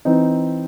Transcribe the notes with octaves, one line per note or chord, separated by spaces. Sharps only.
E3 C4 D#4